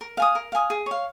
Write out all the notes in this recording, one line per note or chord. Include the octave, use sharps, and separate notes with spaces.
A#4
F5 G#5 D#6
A#4
F5 G#5 D#6
G#4
C#5 F5